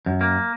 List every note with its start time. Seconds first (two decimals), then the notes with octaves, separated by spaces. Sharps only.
0.06 F#2
0.21 A#3